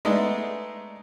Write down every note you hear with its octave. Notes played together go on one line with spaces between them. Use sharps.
G#3 A3 B3 D4 D#4